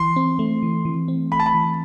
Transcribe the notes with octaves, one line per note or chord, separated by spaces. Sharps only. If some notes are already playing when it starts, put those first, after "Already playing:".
Already playing: E3 C6
C4
A3
E3
E3
C4
A3 B5
A5
B5
E3